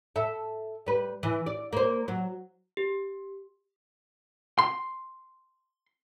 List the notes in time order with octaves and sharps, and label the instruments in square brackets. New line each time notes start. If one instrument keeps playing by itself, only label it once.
[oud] A4 E5
G3 B4
E3
D5
A#3 C5
F#3
[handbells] G4
[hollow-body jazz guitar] C6